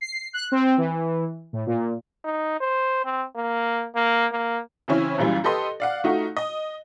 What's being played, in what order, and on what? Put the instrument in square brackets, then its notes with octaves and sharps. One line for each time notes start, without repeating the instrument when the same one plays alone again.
[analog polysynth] C7
F#6
C4
E3
A2
A#2
[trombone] D#4
C5
C4
A#3
A#3
A#3
[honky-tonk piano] C#3 E3 C4 C#4 E4 C#5
F#2 A#2 E3 G3
G4 A4 B4 D#5 C6
D5 F5 F#5
A3 D#4 F4 F#4
D#5